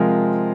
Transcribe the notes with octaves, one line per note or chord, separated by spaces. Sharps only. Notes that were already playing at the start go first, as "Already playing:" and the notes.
Already playing: C3 F3 G#3 F4 A#4